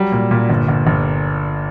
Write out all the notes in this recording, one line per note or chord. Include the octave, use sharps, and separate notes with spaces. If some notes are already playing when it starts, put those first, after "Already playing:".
Already playing: F#3 G3
A#2
A#2
G1
G1
G1